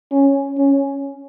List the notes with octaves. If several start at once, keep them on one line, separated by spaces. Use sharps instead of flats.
C#4
C#4